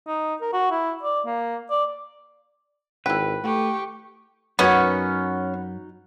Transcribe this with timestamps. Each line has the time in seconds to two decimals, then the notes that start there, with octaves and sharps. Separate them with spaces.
0.07 D#4
0.41 A#4
0.53 F#4
0.71 E4
1.03 D5
1.26 A#3
1.70 D5
3.06 G#1 E4 B4 G5
3.44 A3 G4 C#6
4.59 F#2 B3 C#4 D#4 F#4 F#5